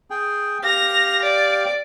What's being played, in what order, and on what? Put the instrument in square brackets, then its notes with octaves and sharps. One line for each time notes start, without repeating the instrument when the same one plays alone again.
[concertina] G#4 G5
[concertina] G4 F5 [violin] A#6 F7
[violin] D5